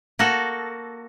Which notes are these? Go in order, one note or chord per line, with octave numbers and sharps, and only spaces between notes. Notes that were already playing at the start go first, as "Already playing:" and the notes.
A#3 F#4 A4